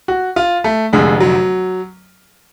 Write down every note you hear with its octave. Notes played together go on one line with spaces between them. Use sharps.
F#4
F4
A3
F1 F2 D3 G#3
F#3